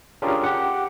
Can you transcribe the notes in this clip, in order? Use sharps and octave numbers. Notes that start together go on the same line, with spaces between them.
C#4 D4 F4 G4 G#4 A#4
G4 F#5